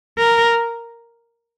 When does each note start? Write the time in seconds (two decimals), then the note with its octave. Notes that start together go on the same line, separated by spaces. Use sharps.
0.18 A#4